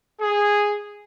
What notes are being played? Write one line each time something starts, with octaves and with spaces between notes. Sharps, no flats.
G#4